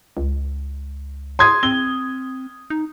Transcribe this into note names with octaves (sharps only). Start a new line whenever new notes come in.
C#2
C6 D#6 G#6
C4 G7
D#4